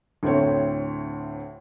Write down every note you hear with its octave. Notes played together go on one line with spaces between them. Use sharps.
D2 A2 C4 C#5